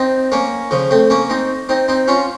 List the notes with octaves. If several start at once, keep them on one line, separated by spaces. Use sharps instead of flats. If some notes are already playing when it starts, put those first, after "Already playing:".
Already playing: C4 D#4
A#3 C#4
C#3 F3
A3 C4
A#3 C#4
C4 D#4
C4 D#4
C4 D#4
C#4 F4